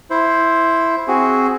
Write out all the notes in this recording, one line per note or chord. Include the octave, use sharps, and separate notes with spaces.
E4 C5
C4 F#4 G#4